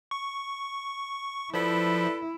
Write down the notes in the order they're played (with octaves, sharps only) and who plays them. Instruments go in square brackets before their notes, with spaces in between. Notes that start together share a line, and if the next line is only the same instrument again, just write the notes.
[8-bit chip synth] C#6
[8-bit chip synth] F3 [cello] E4 [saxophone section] A4 B4 D5